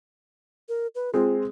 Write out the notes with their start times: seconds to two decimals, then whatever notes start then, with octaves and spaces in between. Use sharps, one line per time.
0.69 A#4
0.95 B4
1.14 G#3 C4 F4